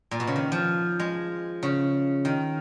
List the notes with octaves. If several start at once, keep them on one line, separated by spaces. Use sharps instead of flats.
A#2
B2
C#3
D#3
F3
G#3
C#3
D#3